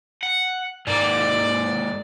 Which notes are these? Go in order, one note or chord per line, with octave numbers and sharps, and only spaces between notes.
F#5
G#2 A#3 D5